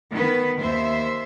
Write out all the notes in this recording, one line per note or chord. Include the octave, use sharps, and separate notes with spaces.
D#3 B3 B4
D#2 C5 E5